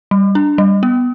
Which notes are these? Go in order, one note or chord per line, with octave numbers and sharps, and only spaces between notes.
G3
D4
G3
B3